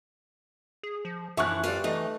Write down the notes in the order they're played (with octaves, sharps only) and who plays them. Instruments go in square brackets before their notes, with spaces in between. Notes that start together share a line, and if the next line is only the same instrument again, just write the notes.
[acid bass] G#4
F3
[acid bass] F#2 [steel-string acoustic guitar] E3 F3 [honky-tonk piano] E5 C#6 F#6
[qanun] G3 B4 [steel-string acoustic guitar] F4 A4 D5
[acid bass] E3 [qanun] A3 B4 [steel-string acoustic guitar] D#4